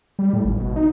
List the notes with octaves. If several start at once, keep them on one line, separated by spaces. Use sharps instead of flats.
G3
A2
G#1
B2
D#4